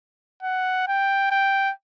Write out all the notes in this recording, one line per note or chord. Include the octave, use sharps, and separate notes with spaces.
F#5
G5
G5